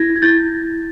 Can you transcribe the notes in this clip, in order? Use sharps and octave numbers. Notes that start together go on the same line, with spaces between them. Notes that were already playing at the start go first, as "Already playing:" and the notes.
Already playing: E4 G#6 A#6
G#6
E4 G6 A6